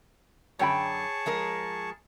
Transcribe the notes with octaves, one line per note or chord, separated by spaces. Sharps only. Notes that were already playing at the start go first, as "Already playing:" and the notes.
F#2 D3 G#4 C#5 G5 A5 B5 C#6
F3 G#3 A#4